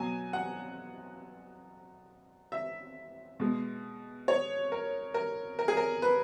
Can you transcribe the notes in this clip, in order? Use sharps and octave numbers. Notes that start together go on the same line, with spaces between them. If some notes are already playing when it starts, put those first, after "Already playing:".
Already playing: B2 F#3 G#5
F#5
E5
B2 G#3
C#5
A#4
A#4
A#4
G#4
A#4
B4